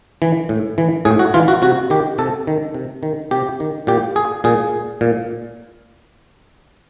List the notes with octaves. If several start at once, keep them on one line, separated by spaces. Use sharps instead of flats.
E3
A2
E3
A2 G#4
F#4
E3 F4
F#4
C3 F#4
D#3 G4
C3 A4
D#3
C3
D#3
C3 G4
D#3
A#2 G4
G#4
A#2 G#4
A#2